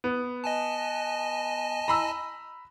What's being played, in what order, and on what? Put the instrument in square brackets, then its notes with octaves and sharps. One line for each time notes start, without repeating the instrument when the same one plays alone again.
[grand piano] B3
[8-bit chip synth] D#5 G#5 A5
[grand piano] A#5 B5 E6